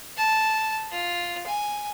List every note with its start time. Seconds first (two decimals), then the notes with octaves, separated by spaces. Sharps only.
0.17 A5
0.92 F4
1.47 G#5